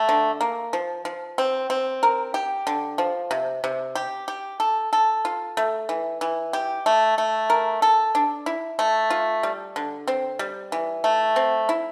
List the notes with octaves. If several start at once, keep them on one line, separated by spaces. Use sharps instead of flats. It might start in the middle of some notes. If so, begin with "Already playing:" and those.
Already playing: A3
D3
A#3
F3
F3
C4
C4
A#4
G4
D3
F3
C3
C3
G4
G4
A4
A4
F4
A3
E3
E3
G4
A3
A3
A#4
A4
D4
E4
A3
F4
G3
D3
C4
G3
E3
A3
C4
E4